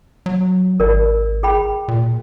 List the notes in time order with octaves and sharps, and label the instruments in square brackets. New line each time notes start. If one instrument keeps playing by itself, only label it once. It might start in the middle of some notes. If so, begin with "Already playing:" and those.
[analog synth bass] F#3
[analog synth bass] G#1 [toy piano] A#4 D5
[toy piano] G#4 G5 B5
[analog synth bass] A#2